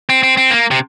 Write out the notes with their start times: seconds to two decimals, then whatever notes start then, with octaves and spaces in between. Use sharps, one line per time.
0.10 C4
0.23 C4
0.37 C4
0.50 A#3
0.71 C3